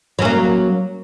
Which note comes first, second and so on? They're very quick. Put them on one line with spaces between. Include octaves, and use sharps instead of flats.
F#3 C#4 A#3